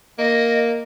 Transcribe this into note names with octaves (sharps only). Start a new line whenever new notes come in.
A#3 D#5